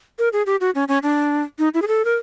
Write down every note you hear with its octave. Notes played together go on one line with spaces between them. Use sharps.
A#4
G#4
G4
F#4
C#4
C#4
D4
D#4
E4
G#4
A4
A#4